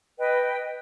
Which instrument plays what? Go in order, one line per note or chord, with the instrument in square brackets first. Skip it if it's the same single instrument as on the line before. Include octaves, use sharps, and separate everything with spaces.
[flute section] B4 D#5 G5